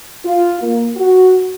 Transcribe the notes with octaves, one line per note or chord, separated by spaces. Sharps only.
F4
A#3
F#4